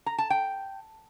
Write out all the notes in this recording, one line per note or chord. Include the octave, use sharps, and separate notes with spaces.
A#5
A5
G5